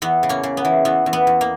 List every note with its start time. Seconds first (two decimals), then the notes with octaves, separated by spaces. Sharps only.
0.02 E2 B3
0.23 C#3
0.29 A#3 C#4
0.43 C#3
0.57 B3
0.65 E3
0.85 E2 B3
1.06 E2
1.13 B3
1.27 E2
1.41 A#3